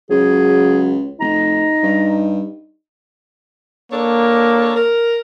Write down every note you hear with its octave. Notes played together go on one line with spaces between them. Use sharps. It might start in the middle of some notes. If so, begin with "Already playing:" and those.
C#2 F#3 G#4
F1 D#4 A#5
G2
A#3 D4 A4 C#5
A#4